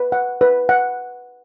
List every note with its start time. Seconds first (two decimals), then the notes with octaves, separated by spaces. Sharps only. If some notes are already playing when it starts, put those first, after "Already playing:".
Already playing: B4
0.12 F#5
0.41 B4
0.69 F#5